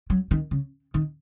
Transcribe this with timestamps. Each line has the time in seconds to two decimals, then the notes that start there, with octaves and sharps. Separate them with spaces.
0.10 F#3
0.31 D#3
0.51 C#3
0.94 D#3